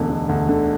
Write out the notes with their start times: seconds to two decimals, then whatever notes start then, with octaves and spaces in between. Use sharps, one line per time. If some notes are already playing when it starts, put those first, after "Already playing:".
Already playing: E1 D2 D3
0.10 E1
0.29 D2
0.49 D3